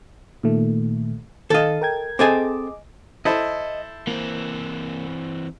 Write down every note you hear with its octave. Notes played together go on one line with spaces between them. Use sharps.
A#2 D#3 A3
D#3 A4 D#5 F5
A#4 G5 G#6
C4 G#4 A4 D#5 G#5 D6
E4 A4 C5 D#5
E3 A#3 C4